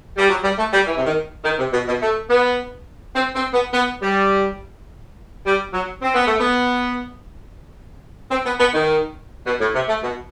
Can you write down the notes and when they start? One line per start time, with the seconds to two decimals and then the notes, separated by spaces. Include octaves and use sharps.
0.18 G3
0.29 F#3
0.44 G3
0.58 A3
0.73 G3
0.87 E3
0.97 C3
1.06 D#3
1.44 D#3
1.59 C3
1.73 B2
1.87 B2
2.02 A3
2.30 B3
3.16 C4
3.35 C4
3.54 B3
3.73 B3
4.02 G3
5.46 G3
5.73 F#3
6.02 C4
6.15 B3
6.27 A3
6.40 B3
8.31 C4
8.46 B3
8.60 B3
8.74 D#3
9.47 B2
9.61 A2
9.75 C3
9.88 A3
10.03 B2